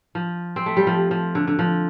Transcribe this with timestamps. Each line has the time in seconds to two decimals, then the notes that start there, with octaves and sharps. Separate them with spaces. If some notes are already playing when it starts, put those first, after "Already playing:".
0.15 F3
0.56 C4
0.66 A3
0.77 G3
0.87 F3
1.11 F3
1.35 D3
1.48 D3
1.59 F3